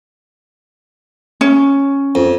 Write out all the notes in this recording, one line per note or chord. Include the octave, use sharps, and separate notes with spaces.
C#4
F2